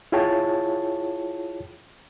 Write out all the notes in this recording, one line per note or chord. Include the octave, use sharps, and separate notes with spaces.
E4 F4 G#4 C#5 G5 A5